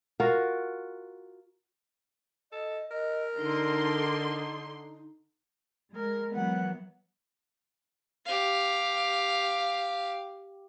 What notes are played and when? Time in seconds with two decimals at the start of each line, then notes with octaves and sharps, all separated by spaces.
0.20 F4 F#4 A#4
2.52 A4 D#5
2.91 A#4 D#5
3.37 D3 D#4 C6
5.95 G#3 A#4
6.35 E3 F#3 B3 F#5
8.26 G4 F5